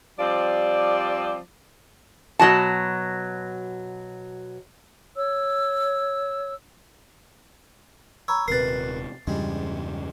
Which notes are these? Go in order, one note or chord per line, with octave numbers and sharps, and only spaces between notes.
F3 G3 C4 D5
B2 F#3 F#4 A5
C#5 E6
C#5 A#5 B5 E6
D#1 C3 A#4 B4 A6 C7
E2 G2 C#3 G3 G#3